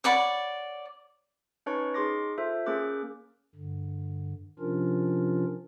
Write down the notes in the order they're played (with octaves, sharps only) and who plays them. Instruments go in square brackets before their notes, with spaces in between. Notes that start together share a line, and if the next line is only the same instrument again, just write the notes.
[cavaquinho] C#5 D5 F#5 B5
[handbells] C#4 D#4 B4 C#5 A5 C#6
D#4 G#4 C6 D6 A#6
F4 A4 C5 E5
A#3 C#4 G#4 A#4 D6 F#6
[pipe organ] G2 D3
C3 F3 C#4 D4 F4 A#4